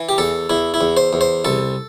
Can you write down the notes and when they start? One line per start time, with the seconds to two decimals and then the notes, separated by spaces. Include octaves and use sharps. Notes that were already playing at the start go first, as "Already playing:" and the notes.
Already playing: E3
0.09 G4
0.18 E2 A4
0.50 E2 E4
0.74 E4
0.81 E2
0.97 C5
1.13 E2
1.21 C5
1.45 C2 A4